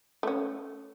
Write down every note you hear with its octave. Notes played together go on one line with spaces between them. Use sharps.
A3 C#4